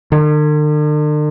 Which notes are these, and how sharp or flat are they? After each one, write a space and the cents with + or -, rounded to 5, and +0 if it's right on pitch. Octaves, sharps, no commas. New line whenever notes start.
D3 +45